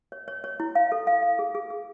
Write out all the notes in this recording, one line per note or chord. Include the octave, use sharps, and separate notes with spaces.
C#5
C#5
C#5
E4
F5
A4
F5
F5
G#4
G#4
G#4